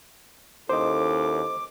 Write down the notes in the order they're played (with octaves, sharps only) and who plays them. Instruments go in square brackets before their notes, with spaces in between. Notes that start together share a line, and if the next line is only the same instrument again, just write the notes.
[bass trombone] D#2 [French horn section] C#4 E4 A4 [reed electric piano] C5 D#5 [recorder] D6